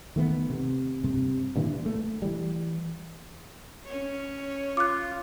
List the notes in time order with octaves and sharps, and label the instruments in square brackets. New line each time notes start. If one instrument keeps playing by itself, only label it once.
[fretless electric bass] D#3 A3 B3
C3
G2 C3
G2 A#2 D3 E3
A3
E3 G3
[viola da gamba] C#4 C#5
[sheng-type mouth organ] F4 [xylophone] D6 F#6